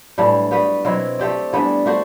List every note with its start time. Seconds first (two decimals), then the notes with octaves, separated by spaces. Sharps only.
0.18 A2 E3 G3 D4
0.51 G3 B3 F#4 B4
0.85 B2 F#3 C4 E4
1.19 A3 C4 G4 D5
1.53 E3 G3 B3 D4
1.86 A3 D4 F#4 C5